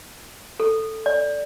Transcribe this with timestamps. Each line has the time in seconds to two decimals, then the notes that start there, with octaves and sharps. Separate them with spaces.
0.60 A4
1.06 D5